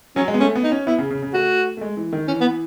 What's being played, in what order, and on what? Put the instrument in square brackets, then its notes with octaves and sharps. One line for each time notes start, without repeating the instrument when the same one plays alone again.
[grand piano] F#3 [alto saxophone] C#4
[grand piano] G#3
B3
[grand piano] A3 [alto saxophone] C#4
[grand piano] B3
[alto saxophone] D#4
[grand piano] C#4
[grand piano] B3 [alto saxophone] E4
[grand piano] C#3
C#3
C#3
[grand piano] A3 [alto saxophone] F#4
[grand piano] A3
G#3
E3
D#3
[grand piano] E3 [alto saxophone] C#4
[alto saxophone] B3